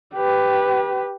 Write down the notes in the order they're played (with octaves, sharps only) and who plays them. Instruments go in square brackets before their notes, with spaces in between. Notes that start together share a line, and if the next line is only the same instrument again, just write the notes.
[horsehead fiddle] G4 B4